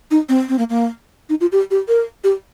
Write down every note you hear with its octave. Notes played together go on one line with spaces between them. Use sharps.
D#4
C4
C4
A#3
A#3
D#4
F4
G4
G4
A#4
G4